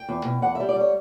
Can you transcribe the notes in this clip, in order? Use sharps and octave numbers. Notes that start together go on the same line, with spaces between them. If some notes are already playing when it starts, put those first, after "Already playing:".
Already playing: G5
E2
B2
E2 F#5
G3 E5
D5
G3 C#5